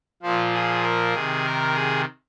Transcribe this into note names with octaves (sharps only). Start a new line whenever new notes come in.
A#2 F3 F4
G#4
A#4
C3 D#3 G#4
A#4
G#4